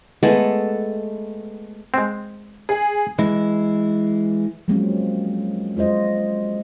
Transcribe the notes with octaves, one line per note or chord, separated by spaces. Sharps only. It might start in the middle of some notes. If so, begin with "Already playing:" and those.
G#3 A3 B3 A4
G#3 C4
G#4
E3 G#3 E4
F3 F#3 G#3 A#3 C4 C#4
G#3 F4 C5 D#5